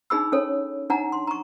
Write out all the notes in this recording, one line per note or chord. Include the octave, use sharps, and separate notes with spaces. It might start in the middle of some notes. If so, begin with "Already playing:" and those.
D4 D#4 G#4 B5 E6
C#4 A4 C#5
D4 D#4 F#5 A#5
C6
A#5 C#6